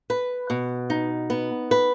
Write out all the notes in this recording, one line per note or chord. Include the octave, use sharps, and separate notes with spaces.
B4
B2
D#4
B3
B4